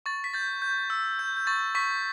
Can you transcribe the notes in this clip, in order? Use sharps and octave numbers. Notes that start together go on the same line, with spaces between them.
C#6 A6
B6
G6 A6
G6
E6
G6
G6
C#6 A6
C#6 B6